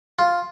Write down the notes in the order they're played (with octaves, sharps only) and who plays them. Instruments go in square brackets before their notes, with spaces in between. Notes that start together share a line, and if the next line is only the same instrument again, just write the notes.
[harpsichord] F4